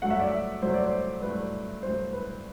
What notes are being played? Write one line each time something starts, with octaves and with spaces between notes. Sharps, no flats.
G2 F#3 A3 F#5
E5
D5
E5
G2 F#3 A3 C5
D5
C5
G2 F#3 A3 B4
G2 F#3 A3 C5
B4